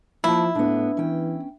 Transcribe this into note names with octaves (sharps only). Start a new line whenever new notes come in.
F3 A#3 E4 A5
A2 B3 D4
E3 C#4 G5